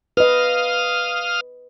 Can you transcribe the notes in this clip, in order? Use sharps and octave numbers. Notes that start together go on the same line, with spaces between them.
B4 D#5 F5 D#6 F6